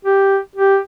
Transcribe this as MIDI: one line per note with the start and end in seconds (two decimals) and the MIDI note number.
0.05 0.38 67
0.56 0.77 67